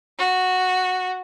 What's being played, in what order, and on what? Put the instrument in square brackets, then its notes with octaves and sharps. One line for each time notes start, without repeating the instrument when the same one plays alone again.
[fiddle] F#4